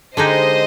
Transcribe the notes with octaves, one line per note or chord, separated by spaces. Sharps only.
D3 G#3 D#4 G4 C5 D#5